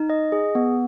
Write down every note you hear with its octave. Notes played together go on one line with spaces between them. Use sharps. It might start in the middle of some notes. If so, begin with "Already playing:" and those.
Already playing: D#4
D#5
G#4
B3